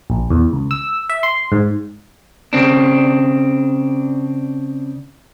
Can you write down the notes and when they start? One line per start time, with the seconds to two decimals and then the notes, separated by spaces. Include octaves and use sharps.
0.10 A#1
0.30 E2
0.53 C#2
0.71 E6
1.09 E5
1.23 C6
1.52 G#2
2.53 C#3 C4 D4